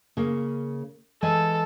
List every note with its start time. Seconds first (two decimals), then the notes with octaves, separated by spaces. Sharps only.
0.17 C#3 A#3
1.22 E3 G#3 A4 G#5